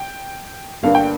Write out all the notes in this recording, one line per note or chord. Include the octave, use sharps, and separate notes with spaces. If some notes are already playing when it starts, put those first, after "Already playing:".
Already playing: G5
G1 G2 D3 A#3 D4 F5
G5